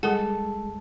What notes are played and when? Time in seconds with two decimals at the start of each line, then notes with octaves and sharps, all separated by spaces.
0.03 G3 G#3 A4 A#4 F#5